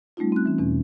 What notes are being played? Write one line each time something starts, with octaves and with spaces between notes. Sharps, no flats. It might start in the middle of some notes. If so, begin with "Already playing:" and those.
G3 A3 C#4 D#4 F4
C4 F#6
E3 C#4
E2 B2 C#4